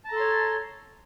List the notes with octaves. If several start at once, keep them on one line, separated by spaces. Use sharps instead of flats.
A4 C#5 A5 A#5 C6